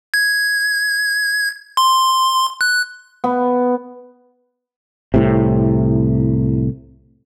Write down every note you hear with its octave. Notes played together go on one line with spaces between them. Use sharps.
G#6
C6
F#6
B3
C2 A2 C3